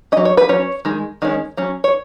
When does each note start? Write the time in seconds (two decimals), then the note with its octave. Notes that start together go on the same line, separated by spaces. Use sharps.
0.12 C#4 D#5
0.17 F#3
0.25 C#5
0.37 B4
0.49 F#3 C#4 C#5
0.85 D#3 G#3
1.22 D#3 G#3 C#4
1.57 F#3 C#4
1.84 C#5